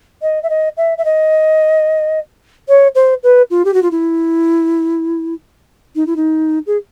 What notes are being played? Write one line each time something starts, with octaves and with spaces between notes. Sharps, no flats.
D#5
E5
D#5
E5
E5
D#5
C#5
C5
B4
F4
G4
F#4
F4
E4
D#4
E4
D#4
G#4